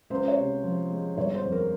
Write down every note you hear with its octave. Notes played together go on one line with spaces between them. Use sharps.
C#2 C5
C#5
C3
F3
G#3
G1 C#5
C5
F2
A#4